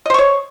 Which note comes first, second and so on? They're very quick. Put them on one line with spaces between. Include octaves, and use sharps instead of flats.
D#5 C5 C#6 C#5